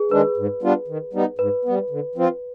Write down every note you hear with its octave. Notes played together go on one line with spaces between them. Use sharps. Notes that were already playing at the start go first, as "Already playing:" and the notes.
Already playing: G#4 B4
D#3 G#3 D4 B4
G#2
G3 B3 D4 F4
D#3
G3 B3 D#4
G#2 B4
G3 B3
D3
F3 C4 F4